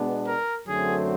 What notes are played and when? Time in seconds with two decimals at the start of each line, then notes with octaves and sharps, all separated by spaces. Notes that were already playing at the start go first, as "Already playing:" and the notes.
Already playing: B2 G#3 B3 D4
0.26 A#4
0.66 F#2 D3 F#3 A3 C4 G#4